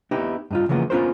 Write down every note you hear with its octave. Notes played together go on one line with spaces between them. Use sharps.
B3 D#4 E4 G4
G2 D#4 F4
C#3 E3 F3 A#3 B3
B3 C#4 F4 A#4 C5